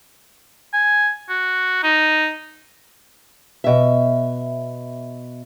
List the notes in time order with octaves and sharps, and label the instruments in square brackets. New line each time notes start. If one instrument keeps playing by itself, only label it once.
[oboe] G#5
F#4
D#4
[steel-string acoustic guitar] B2 E5